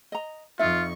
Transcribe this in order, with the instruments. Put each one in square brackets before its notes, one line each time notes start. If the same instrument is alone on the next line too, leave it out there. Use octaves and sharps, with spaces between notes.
[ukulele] D#5 A#5
[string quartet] F2 C#6 [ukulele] D#4 E5 [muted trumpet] F4